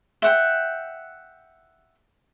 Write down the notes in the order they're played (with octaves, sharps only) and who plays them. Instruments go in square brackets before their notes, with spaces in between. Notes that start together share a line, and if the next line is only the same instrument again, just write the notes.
[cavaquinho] E5 F#5 G5